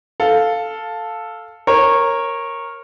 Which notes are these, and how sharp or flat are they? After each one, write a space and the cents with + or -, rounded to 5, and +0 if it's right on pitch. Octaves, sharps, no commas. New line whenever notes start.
A4 +0 F5 +5
A#4 +0 C#5 -20